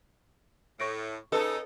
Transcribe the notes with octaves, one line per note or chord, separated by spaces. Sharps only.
A2 C#6 A#6 D7
C#3 D#4 A4 B4